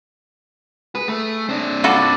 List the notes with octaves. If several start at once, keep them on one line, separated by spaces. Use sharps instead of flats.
G#4 B4
A3
C4 D4
F4 F#4 A4 D5 A5 B5